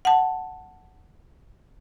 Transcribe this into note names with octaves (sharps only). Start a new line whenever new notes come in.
F#5 A5